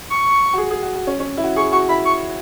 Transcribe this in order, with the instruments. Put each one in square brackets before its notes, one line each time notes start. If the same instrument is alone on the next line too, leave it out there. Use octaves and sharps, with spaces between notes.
[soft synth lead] C#6
[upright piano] F#4
G#4
G#4
F#4
F#4
C#4
C#4
E4
F#4
[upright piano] G#4 [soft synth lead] C#6
[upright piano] F#4 [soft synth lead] C#6
[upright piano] E4 [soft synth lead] B5
[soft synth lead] C#6